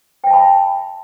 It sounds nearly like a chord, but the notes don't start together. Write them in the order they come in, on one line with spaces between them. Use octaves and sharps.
G5 E5 A5 B5